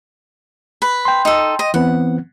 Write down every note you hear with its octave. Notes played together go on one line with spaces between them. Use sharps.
B4
G5 C6
D#4 A4
D#5
E3 B3 C4 F#5